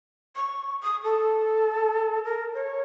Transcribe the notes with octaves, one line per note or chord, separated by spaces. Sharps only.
C#6
D#6
A4
A#4
C#5